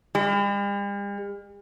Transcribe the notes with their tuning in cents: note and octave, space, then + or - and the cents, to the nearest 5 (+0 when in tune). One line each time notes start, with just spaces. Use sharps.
G3 +45